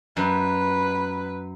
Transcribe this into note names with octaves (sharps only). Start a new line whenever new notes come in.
F#2 B4